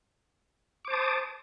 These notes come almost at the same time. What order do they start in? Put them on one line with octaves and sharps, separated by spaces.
D6 C5 A5 D#6